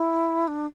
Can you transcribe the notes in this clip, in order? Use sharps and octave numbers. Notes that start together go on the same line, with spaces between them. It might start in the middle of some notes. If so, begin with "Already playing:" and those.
Already playing: E4
D4